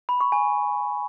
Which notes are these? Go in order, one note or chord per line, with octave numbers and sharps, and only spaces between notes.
B5
C#6
G#5